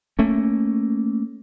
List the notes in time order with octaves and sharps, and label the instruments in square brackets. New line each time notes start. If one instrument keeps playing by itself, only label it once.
[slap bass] A3 A#3 C#4